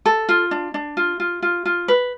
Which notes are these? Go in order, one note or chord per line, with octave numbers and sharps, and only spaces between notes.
A4
F4
D4
D4
F4
F4
F4
F4
B4